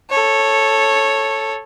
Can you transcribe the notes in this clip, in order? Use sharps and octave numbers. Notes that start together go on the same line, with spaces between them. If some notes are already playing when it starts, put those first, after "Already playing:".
A4 C#5